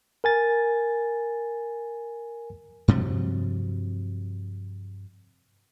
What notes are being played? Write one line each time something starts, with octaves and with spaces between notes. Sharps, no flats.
A#4 G#5 A6
G2 C3 F3 F#3